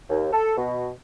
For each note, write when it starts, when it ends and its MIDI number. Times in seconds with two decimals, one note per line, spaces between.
0.10 0.30 39
0.33 0.55 69
0.57 0.87 47